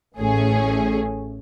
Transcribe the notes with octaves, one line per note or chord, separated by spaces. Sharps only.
A1 A3 C#4 G#4